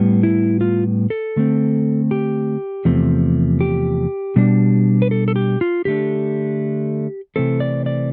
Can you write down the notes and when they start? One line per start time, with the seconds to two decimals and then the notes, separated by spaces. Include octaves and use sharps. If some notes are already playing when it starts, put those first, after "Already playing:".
Already playing: A2 G3 B3
0.23 E4
0.61 F4
1.10 A4
1.36 D3 A3 C4
2.11 G4
2.85 E2 C3 F3 A3
3.61 G4
4.36 B2 G3 D4
5.02 B4
5.11 A4
5.28 A4
5.36 G4
5.61 F4
5.85 D3 A3 D4 G4
7.36 C3 E3 A3 C4 A4
7.60 D5
7.86 D5